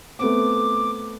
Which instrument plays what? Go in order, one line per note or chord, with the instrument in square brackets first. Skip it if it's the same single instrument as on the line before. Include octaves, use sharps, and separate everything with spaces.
[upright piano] A3 B3 C4 [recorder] D6